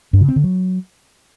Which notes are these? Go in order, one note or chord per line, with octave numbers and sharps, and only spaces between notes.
G2
C#3
C4
D3
F#3